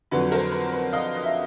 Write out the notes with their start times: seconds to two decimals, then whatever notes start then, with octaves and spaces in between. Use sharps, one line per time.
0.11 F2 D3 F#3 B4
0.32 A#4 C5
0.52 B4
0.72 B4
0.93 D#5 F5
1.15 D#5
1.23 E5